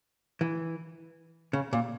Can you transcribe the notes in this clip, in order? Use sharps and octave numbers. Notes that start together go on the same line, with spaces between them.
E3
C#3
A#2